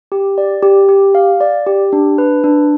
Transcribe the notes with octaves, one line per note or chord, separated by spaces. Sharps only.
G4
D5
G4
G4
F5
D5
G4
D4
B4
D4